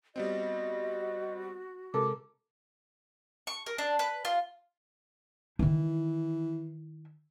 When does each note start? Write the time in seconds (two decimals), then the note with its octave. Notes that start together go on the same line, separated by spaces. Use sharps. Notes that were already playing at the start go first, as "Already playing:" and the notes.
0.16 G3 B3 C4 F#4 D#5
1.94 C3 G#3 A4 A#4 D6
3.47 C#6
3.66 A#4
3.78 D4
3.99 B4
4.25 F4
5.59 D#3 E3 E4